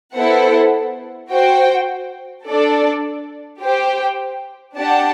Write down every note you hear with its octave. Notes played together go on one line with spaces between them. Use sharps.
B3 E4 A4 C5 F#5
F#4 C5 G5
D4 A4 D5
G4 C5 G5
D4 G4 D5 F#5 A5